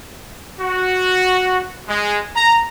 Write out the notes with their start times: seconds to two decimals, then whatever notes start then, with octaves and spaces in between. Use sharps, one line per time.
0.60 F#4
1.88 G#3
2.36 A#5